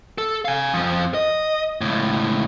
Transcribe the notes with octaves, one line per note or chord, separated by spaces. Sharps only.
A4
F5 G#5
F2 F3
D#5
C#2 A2